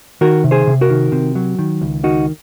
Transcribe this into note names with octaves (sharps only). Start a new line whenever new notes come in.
D#3 F#4 A#4
C3
G#4 C5
C3
F#4 A#4
D#3
C3
F#3
D#3
C#2
D#3 D#4 F#4